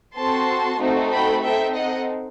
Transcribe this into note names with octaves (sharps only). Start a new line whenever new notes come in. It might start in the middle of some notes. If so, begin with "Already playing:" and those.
C4 F#4 A4 A5 C6
A3 C4 D#4 F#4 A4
G5 B5
C4 D#4 A4 E5 G5
D#5 F#5